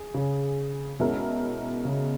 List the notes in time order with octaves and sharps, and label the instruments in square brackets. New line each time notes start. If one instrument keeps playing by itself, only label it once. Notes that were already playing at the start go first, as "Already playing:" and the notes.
Already playing: [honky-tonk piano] G#4
[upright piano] C#3
[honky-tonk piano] B2 G#3 C#4 E4 A#4
[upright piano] C#3